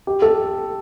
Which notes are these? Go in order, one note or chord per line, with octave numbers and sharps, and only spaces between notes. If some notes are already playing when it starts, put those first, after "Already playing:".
G4
A4